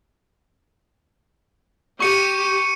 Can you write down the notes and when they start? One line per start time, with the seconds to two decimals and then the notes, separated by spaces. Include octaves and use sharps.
2.00 G4 C#6 C#7 D#7